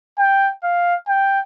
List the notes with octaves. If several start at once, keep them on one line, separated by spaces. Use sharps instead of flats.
G5
F5
G5